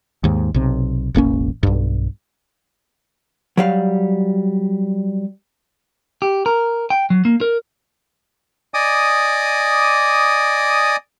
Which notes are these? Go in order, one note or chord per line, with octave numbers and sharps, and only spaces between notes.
D#2 G#2
B1 C3
E1 A1 A#3 C#4
B1 G2
F#3 G3 F5
G4
A#4
G5
F#3
A#3
A#4
D5 D#5 G#5 D6 D#6